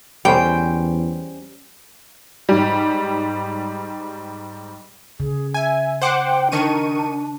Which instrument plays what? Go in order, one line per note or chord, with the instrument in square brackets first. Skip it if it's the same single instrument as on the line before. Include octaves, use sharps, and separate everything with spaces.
[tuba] E2 [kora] G3 C#4 C5 [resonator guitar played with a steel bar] G5
[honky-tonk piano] G#2 G3
[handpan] C#3 [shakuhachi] G#4
[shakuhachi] E5 [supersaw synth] G#5
[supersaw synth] C5 F#5 D6 [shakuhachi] G5
[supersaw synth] D#3 C#6 D#7 [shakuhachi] D4